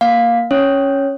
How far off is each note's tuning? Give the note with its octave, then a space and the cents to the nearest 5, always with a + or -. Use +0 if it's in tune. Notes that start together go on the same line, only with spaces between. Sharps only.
A#3 +0 F5 +10
C#4 -5 C#5 +0